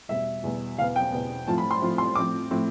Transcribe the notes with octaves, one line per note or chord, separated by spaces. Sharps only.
E2 B2 G3 E5
E2 B2 G3
E2 B2 B3 F5
G5
E2 B2 B3
A2 F3 C4 F4 A5
B5
C6
A2 F3 C4 F4
C6
A2 F3 C4 D6
A2 F3 C4